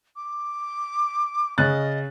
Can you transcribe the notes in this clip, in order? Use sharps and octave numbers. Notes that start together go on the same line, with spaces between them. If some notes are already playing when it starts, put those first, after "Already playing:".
D6
C#3 D#5 F#6 A6